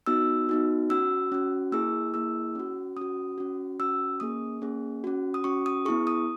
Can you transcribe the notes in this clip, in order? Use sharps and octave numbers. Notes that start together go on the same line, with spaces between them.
B3 D#4 F#4 E6
B3 D#4 F#4
C#4 F#4 E6
C#4 F#4
A#3 E4 G#4 E6
A#3 E4 G#4 E6
C#4 F#4
C#4 F#4 D#6
C#4 F#4
C#4 F#4 E6
A#3 C#4 G#4 D#6
A#3 C#4 G#4
C#4 F#4
D#6
C#4 F#4 C#6
D#6
B3 E4 G#4 C#6
D#6